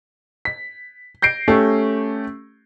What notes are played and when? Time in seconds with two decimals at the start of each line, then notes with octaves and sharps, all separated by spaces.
0.45 B6
1.22 G6 A#6 C7 D7
1.48 A3 C#4 G4